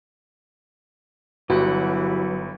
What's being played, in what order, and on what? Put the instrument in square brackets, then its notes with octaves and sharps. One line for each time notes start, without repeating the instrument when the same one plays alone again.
[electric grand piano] G1 [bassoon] E3 [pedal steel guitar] F#3 F#5 [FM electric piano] F#4 G4